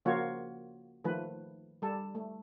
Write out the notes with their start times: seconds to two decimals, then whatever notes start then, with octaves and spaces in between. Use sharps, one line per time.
0.05 C#3 F3 A#3 F4 F#4 C#5
1.04 D#3 F3 A3 B4
1.82 G3 A4
2.15 A3